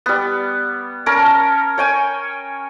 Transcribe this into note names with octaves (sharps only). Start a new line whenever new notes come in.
G3 B3
C#4 A#4 A5
C#5 G5 G#5